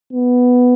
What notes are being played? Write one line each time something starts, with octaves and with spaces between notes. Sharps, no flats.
B3